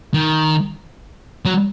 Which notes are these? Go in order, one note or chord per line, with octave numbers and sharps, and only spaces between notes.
D#3
F#3